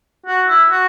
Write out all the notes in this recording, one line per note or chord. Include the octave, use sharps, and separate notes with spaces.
F#4
E4
F#4